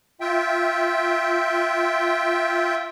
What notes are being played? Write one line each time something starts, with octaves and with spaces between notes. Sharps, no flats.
F4 E5 G5